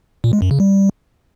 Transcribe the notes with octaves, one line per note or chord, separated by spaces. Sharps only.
A#2
G#3
F#2
C#3
G3